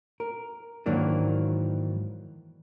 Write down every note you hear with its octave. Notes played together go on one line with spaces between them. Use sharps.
A#4
G#2 D#3 E3 F#3 A#3 D4